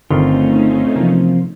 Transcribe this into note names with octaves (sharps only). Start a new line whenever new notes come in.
G1 D3 D#3 A3 C4 C#4 D#4 F4
C3 E3 F3 A#3